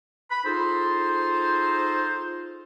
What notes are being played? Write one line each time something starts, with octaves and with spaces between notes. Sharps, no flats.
B5
D#4 F4 G#4 A4 C5